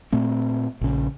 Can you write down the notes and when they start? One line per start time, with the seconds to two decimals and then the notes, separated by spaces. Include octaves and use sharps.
0.12 A#2 A3 C4
0.81 A#1 C#3